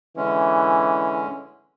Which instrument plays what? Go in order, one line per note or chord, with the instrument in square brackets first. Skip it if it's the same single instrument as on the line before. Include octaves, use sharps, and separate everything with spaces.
[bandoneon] D3 G#3 C#4 [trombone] E3